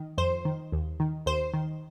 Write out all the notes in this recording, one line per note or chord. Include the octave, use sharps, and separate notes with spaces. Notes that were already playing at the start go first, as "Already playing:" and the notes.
Already playing: D#3
F2 C5
D#3
D#2
D#3
D#2 C5
D#3